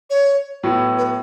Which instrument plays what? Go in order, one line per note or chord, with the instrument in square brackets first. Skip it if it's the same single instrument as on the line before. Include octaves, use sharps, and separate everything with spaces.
[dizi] C#5
[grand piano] A2 F#3 B3
[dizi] B4